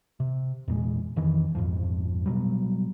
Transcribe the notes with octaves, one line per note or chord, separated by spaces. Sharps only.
C3
E2 A#2 G#3
F2 D#3 E3
A#1 F2 G#2 F3
B2 F#3 G3